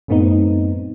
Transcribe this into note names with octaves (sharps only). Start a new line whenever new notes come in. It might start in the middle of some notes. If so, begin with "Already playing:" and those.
F#2 A2 A3 B3 C4 D#4